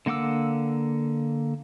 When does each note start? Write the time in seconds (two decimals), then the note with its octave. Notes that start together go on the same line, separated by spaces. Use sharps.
0.06 D3 A#3 F#5 D6 E6